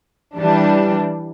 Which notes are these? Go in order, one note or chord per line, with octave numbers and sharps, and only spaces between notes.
E3 G3 D4